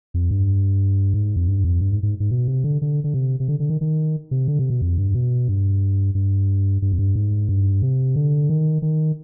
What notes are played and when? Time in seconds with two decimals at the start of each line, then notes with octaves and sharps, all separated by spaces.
0.14 F2
0.31 G2
1.14 G#2
1.36 F2
1.48 G2
1.64 F2
1.81 G2
1.92 G#2
2.03 G#2
2.20 G#2
2.31 B2
2.48 C3
2.64 D3
2.82 D3
3.04 D3
3.14 C3
3.40 C3
3.48 D3
3.60 D3
3.70 D#3
3.81 D#3
4.31 C3
4.48 D3
4.59 C3
4.70 B2
4.82 F2
4.98 G2
5.14 B2
5.48 G2
6.15 G2
6.82 G2
6.92 F2
6.99 G2
7.15 G#2
7.49 G2
7.82 C3
8.16 D3
8.49 D#3
8.82 D#3